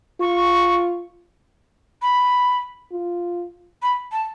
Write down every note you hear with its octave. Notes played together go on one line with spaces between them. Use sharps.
F4 C#6
B5
F4
B5
A5